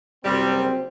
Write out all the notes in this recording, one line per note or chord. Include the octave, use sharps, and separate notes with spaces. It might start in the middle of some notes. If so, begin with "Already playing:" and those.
F#1 C3 G3 C4